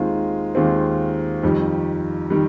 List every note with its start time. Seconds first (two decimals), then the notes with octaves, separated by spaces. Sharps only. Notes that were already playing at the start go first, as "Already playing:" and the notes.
Already playing: D#2 D#3 G#3 C4 F4
0.55 D#2 D#3 G#3 C4 F4
1.43 F2 D#3 G3
2.30 D#3 G3